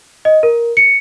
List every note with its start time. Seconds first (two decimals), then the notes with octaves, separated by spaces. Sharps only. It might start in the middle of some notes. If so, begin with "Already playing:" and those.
0.25 D#5
0.43 A#4
0.77 C#7